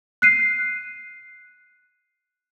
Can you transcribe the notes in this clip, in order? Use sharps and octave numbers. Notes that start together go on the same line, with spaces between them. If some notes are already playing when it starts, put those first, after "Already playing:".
F#6 C7 D#7